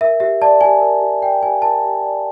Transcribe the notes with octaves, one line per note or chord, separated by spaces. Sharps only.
A#4 E5
G4 E5
D5 A5
G4 G#5
A#4
G4
D5 G5
G4 G#5
A#4 A5
G4
D5